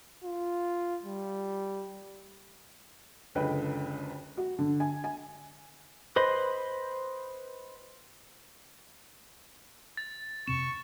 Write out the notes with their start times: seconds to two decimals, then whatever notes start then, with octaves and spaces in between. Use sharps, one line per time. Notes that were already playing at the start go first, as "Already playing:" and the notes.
0.24 F4
1.03 G3
3.35 F#1 C#2 D3 B4 D#5 G5
4.37 F#4
4.59 D3
4.80 G#5
5.04 G#5
6.16 B4 C5 D#5 B5
9.97 A6
10.48 F2 C3 C4 C#6 E7